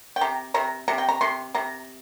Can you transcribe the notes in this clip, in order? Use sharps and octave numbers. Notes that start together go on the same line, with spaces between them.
G5
C3 A#5
C3 A#5
C3 A#5
G5
A#5
C3 C6
C3 A#5